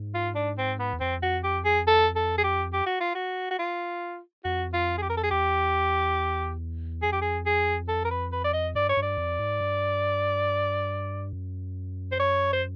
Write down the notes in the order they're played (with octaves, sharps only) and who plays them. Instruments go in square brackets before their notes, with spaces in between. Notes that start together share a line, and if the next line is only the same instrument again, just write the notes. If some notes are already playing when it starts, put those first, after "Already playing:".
Already playing: [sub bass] G#2
[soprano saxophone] F4
D4
C4
B3
[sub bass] E2
[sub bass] F2 [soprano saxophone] C4
[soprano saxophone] F#4
G4
G#4
A4
A4
G#4
G4
G4
F#4
F4
F#4
F#4
F4
[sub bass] F2 [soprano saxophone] F#4
[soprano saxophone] F4
G#4
G4
A#4
A4
G#4
[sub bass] E2 [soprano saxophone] G4
[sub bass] F2 [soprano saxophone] G#4
[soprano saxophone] G4
G#4
G#4
A4
A#4
B4
B4
D5
D#5
[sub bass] G2 [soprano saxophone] D5
[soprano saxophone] C#5
[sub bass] G2
[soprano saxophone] D5
[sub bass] F2
G#2
G2
F#2
[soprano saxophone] C5
C#5
C5